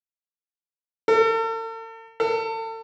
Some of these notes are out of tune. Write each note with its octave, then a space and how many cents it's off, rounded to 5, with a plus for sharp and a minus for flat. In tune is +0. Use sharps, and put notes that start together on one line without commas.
A4 +45
A4 +35